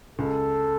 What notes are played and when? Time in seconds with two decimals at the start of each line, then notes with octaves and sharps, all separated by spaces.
0.19 C#2 A4